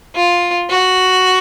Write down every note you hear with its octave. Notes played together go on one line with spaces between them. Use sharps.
F4
F#4